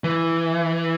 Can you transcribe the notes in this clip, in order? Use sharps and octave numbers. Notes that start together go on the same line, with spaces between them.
E3